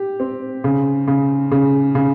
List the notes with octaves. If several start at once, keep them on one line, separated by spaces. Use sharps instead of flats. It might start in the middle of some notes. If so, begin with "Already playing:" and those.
Already playing: G4
C4
C#3
C#3
C#3
C#3